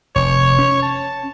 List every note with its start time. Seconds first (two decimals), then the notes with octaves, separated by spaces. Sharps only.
0.16 F1 C#5
0.59 C#4
0.83 A5